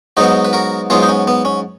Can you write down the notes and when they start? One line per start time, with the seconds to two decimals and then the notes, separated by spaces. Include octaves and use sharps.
0.17 G#2 F#3 B3 D#4 F#4
0.45 B4
0.53 F#4 A#4
0.90 G#2 F#3 B3 F4 G#4
1.03 D#4
1.09 C#4
1.27 B3
1.45 C#4